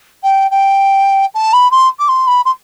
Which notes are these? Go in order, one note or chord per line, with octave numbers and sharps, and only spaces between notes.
G5
G5
A5
B5
C6
D6
C6
B5
C6